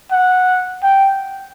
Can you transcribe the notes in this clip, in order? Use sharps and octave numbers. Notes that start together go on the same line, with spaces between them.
F#5
G5